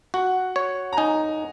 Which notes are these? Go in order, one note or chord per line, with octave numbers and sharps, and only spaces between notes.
F#4 F#5
C#5
A#5
D#4 G#5